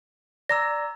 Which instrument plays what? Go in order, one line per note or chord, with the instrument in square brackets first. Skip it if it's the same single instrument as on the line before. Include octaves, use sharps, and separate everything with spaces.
[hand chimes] D5 A#5 E6 [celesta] A#6